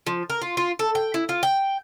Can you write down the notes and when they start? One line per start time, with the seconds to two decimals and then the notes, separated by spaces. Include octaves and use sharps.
0.07 F3
0.30 A#4
0.42 F4
0.57 F4
0.79 A4
0.95 G5
1.14 E4
1.29 F4
1.43 G5